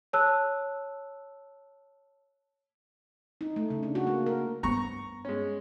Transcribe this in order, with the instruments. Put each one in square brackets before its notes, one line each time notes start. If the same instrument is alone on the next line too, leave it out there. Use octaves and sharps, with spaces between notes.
[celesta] C#5 A5 E6 F#6
[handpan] D#4
A3
C#3
D4
F#4
A#3
A#4
[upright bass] G2 B3 [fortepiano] A#5 C#6
[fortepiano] G#3 C#4